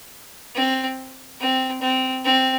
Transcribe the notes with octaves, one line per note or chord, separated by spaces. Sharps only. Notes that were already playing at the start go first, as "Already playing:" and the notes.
C4
C4
C4
C4